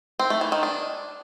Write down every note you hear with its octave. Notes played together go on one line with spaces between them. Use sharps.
C4
A3
E3
D#3
D4